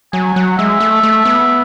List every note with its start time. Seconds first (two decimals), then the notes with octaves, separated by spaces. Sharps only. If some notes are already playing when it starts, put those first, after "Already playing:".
0.13 F#3 G#5
0.36 F#3 F#5
0.58 G#3 E5
0.80 A3
1.03 A3
1.25 B3